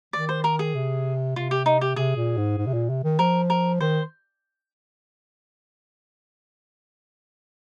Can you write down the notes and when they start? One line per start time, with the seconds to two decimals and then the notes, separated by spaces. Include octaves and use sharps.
0.13 D#3 D5
0.29 C5
0.44 A#4
0.59 G#4
0.75 C3
1.36 C3 F4
1.51 G4
1.66 D#4
1.81 G4
1.96 C3 G#4
2.17 A#2
2.37 G#2
2.58 G#2
2.67 C3
2.74 A#2
2.89 C3
3.04 D#3
3.19 F3 A#4
3.50 A#4
3.80 D#3 C5